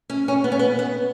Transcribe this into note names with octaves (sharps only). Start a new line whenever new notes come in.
C#4
C#4
B3
C#4
B3
B3